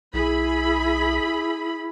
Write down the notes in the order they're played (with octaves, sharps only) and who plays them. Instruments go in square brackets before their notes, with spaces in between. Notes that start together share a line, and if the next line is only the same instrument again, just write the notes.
[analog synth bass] B1 [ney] E4 [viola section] G#4 B5